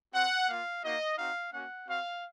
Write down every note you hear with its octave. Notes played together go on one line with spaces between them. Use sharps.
C4 F#4 F#5
A#3 F4 F5
A#3 D#4 F#4 D#5
C4 D#4 F#4 F5
A#3 C#4 F#4 F#5
C4 F#4 F5